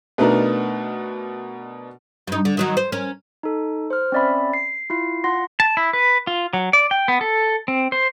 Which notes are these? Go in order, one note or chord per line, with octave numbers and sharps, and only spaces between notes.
B2 A3 B3 D4 D#4 A#4
G2 D#4
D3
D#3 F#3 D#4
C5
C#4 A#4
D#4 A4
C5 F6
C4 C#4 D5 E5 B5
C7
E4 F4 C7
F4 F#5 C6 A#6
A5
E4
B4
F4
F#3
D5
G5
B3
A4
C4
C5